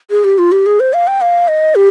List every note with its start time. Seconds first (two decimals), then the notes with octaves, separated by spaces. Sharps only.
0.10 G#4
0.24 G4
0.38 F4
0.52 G4
0.66 G#4
0.80 C5
0.93 F5
1.07 G5
1.21 F5
1.48 D#5
1.75 G4